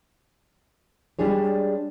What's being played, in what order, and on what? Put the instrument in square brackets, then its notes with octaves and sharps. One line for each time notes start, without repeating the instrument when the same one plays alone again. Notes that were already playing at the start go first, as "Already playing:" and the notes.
[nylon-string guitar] G3 G#3 D4 G#4 C#5